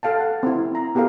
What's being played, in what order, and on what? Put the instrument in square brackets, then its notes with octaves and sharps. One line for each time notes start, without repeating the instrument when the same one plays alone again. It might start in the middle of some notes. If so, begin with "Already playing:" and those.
[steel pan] A4 F5 G5 A5
F#5
C4 E4
A#5
B3 G4 A4 A#4 F5